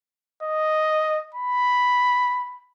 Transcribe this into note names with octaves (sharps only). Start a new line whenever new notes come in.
D#5
B5